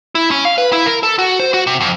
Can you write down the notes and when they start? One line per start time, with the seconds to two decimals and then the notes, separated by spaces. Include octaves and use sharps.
0.15 E4
0.31 C#4
0.45 F5
0.58 B4
0.73 E4
0.86 A#4
1.03 A4
1.19 F#4
1.40 C5
1.54 F#4
1.67 C3
1.81 F2